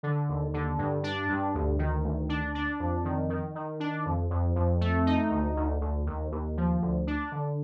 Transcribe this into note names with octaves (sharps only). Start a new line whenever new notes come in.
D3
D#2
D3
G2
D4
G2
D2
D#3
D2
D4
D4
F2
D#3
D#3
D#3
D4
F2
F2
F2
A3
D#4
D2
D2
D2
D#2
D#2
F3
D2
D4
D3